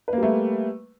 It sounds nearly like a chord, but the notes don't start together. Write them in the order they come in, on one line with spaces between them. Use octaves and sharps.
B4 A#3 G3 A3